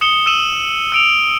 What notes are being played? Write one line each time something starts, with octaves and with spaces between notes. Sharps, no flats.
D#6 C#7 E7 G7
E6 D#7 E7 F#7
E6 D7 F7